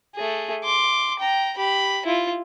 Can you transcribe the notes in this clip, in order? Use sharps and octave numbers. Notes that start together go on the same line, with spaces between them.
A3 G#4
C6 D6
G5 A#5
G4 B5
E4 F4